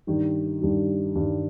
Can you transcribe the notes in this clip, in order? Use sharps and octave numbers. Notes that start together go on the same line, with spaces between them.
G2 D#3 G3
G2 D#3 G3
G2 D#3 G3